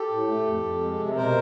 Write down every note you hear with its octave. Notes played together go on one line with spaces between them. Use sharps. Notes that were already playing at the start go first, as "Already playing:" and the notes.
Already playing: G4 A4
A2
A3
F2
F2
G#3
C3
B2 A#4 C5